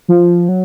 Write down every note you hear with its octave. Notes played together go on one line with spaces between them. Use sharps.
F3
F#3